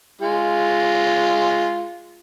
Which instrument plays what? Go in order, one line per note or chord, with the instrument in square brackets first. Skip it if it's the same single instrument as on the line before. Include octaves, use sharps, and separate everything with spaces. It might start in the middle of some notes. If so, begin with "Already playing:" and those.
[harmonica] G#3 F4